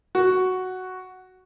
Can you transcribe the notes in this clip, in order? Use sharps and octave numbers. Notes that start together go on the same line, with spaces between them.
F#4